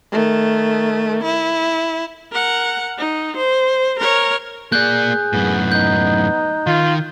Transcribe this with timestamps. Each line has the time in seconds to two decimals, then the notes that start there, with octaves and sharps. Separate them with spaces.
0.12 D#3 A3
1.23 E4
2.32 A#4 F#5
2.98 D#4
3.37 C5
3.99 A#4 C#5
4.72 A#3 G#4 D5 F#6 G6
5.33 F#2 A2 B3
5.72 D#4 G6
6.67 D#3 F4